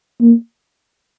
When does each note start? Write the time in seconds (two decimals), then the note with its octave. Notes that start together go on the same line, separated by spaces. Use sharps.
0.21 A#3